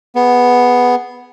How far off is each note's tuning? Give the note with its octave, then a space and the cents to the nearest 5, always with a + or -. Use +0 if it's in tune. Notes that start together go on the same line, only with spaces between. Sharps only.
B3 +0 G#4 +0